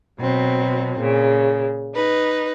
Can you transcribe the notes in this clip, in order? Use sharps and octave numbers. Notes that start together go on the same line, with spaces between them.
B2 F#3 C4
A#2 C#3
D#4 B4